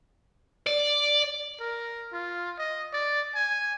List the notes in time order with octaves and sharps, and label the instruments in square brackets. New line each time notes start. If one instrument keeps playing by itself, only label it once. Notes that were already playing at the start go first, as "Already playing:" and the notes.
[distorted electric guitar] D5
[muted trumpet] A#4
F4
D#5
D5
G#5